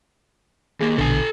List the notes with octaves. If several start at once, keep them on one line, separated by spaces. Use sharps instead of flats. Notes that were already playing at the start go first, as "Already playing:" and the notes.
D#2 A#3 G#4
A#1 B2 D3 A4 G#5